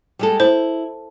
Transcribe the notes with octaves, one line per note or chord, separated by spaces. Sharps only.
G3 G#3 A4
E4 C5